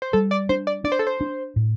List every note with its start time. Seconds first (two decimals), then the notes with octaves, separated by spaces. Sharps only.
0.02 C5
0.13 G3 A4
0.31 D5
0.49 D4 C5
0.67 D5
0.84 D4 D5
0.92 C5
0.99 A4
1.07 C5
1.21 D4
1.56 A2